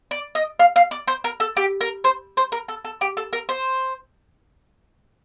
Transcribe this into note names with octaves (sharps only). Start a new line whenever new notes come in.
D5
D#5
F5
F5
D5
C5
A#4
A4
G4
A#4
C5
C5
A#4
A4
A4
G4
A4
A#4
C5